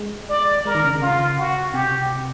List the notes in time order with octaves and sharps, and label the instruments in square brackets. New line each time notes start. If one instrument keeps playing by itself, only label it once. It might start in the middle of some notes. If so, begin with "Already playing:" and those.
Already playing: [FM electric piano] G#3
[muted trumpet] D5
[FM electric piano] G#3 [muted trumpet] A#4
[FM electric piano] D#3
C#3
D3
[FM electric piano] C#3 [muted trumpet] F4
[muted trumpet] F#4
[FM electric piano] C3 [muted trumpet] G4